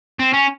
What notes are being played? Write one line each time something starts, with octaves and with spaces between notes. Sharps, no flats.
C4
C#4